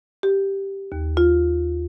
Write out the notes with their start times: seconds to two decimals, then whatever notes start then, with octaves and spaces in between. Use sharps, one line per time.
0.23 G4
0.92 D#2
1.17 F4